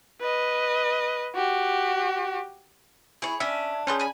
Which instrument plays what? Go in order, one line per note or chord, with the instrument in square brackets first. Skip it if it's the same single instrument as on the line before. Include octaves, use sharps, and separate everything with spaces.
[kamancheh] B4 D#5
F#4 G4
[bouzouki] E4 [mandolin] G#4 C#5
[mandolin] C#4 [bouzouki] D4 [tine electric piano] E5
[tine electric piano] C#4 G#4 [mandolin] B4 C6 G6
[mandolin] G#5 B5